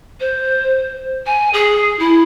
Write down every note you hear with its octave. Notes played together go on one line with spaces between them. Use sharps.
C5
G#5
G#4
E4